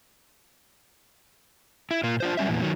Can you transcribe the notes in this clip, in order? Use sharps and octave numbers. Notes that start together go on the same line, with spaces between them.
E4
A#2 A#3 F4
D4 F4 C5
F#3 G3 C#4 E5
E2 A#2 E3
D#3 F#3